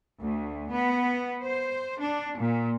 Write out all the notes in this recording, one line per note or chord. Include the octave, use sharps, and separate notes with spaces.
D2
B3
C5
D4
A#2